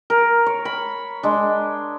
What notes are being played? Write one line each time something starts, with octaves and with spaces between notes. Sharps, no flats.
A#4
C#5
B5
G#3 D4